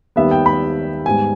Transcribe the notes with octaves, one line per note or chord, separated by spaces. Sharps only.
D#2 D#3 G3 B3 E5
G5
B5
G#2 G3 B3 G#5